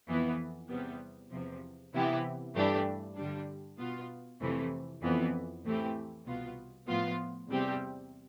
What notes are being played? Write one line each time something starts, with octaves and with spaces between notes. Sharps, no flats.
F2 E3 B3
E2 C3 G3 B3
E2 C3 F3
C3 E3 B3 E4 G4
G2 E3 A3 D4 G4
G2 D3 G3 D4
B2 B3 F4
F2 C3 E3 A3
F2 E3 B3
A2 E3 A3 C4 G4
C2 B2 B3 F4
A2 F3 B3 F4
E2 C3 G3 C4 G4